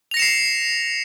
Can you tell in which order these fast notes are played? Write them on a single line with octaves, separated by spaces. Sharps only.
F7 A#6 C#7 E7 C7